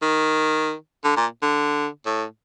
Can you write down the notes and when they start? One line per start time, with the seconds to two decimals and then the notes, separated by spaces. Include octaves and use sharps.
0.02 D#3
1.04 D3
1.16 A#2
1.42 D3
2.06 A2